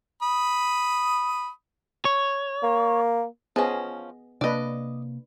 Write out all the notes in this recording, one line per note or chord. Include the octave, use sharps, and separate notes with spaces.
B5 D#6
C#5
A#3
F3 B3 C#4 G#4 D#5
C3 A#3 D4 B4 D5 D#5